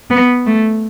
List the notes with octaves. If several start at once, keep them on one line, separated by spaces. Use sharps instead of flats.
B3
A3